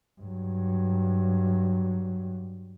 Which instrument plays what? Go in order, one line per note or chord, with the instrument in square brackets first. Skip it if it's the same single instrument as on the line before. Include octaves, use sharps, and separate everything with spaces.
[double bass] G2 F#3